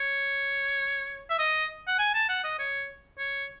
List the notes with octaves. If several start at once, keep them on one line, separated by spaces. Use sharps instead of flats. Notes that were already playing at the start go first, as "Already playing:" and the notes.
Already playing: C#5
E5
D#5
F#5
G#5
A5
F#5
D#5
C#5
C#5